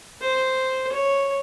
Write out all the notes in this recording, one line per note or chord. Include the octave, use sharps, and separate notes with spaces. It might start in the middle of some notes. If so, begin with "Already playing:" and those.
C5
C#5